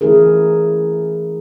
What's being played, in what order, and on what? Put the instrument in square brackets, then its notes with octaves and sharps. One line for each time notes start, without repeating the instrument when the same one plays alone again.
[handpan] E3 A3 C#4 E4 G#4 A#4